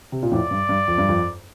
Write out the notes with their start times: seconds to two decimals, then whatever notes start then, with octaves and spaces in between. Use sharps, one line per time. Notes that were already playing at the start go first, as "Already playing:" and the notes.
0.12 C3
0.23 A#2
0.31 F2 A2 D5
0.51 G2
0.69 G2
0.88 F2
0.98 G2
1.09 F2